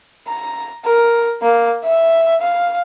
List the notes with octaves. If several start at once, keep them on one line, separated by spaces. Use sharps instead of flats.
A#5
A#4
A#3
E5
F5